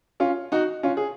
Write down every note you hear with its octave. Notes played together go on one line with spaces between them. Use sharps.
C#4 F4
D#4 F#4
C#4 F4
G#4